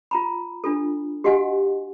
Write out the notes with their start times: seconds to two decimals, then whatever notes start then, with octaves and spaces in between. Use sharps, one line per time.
0.11 F4 A#5 B5
0.64 D4 F4 A4
1.24 F#4 G4 D#5 F5 F#5 G#5